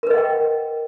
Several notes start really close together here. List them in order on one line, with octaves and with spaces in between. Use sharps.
A#4 B4 D#5 F#5 G5